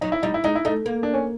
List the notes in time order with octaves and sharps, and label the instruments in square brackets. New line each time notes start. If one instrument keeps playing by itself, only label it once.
[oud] F#3 [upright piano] D#4
[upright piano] E4
[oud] G3 [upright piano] D#4
[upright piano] E4
[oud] G#3 [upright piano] D#4
[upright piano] E4
[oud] A3 [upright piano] D#4
[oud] A#3
[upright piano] D4
C#4